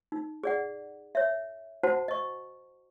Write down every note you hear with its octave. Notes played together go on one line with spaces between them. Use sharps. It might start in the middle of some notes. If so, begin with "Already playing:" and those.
D#4
G#4 D5 F#5
C#5 E5
E4 F#4 C5 F#5 A5
D#5 C#6